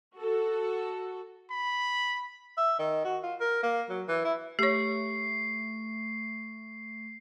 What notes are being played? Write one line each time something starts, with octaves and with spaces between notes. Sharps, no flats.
F#4 A4
B5
E5
D#3
F#4
F4
A#4
A#3
F#3
E3
E4
A3 G4 C#5 C#6 C7